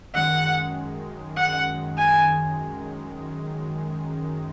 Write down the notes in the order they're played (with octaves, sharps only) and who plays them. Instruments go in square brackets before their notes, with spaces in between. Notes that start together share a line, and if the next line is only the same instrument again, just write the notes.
[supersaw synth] F#2 D#3 G#3 [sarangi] F#5
[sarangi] F#5
G#5